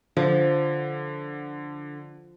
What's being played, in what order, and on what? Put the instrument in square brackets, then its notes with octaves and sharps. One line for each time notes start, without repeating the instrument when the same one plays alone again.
[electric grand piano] D3 [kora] F3